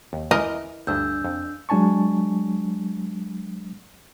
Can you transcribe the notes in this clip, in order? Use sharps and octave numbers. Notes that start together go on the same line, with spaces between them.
D#2
E3 A#4 D#5
D2 G2 G3 D4 E6 G6
F2
F#3 G#3 D4 G#5 A5 C#6